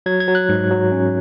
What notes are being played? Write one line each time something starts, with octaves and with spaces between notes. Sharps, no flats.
F#3 G#6
G#6
F#3
F#6
G#2
F#3
C#4